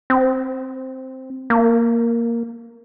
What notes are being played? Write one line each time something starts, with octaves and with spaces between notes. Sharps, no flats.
C4
A#3